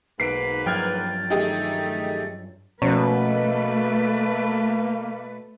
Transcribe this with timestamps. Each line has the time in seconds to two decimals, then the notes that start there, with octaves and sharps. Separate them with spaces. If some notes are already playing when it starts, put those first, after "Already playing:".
0.20 B1 G#2 A#3 B4 B6 C7 D7
0.66 G2 F3 F#3 G5 F6 G#6 A6
1.30 D#3 A3 D#4 G4 G#4
2.82 B2 F3 A3 A#3 C#4 B4 C5